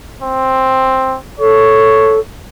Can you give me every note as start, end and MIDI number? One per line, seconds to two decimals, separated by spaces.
0.22 1.17 60
1.40 2.19 69
1.40 2.20 73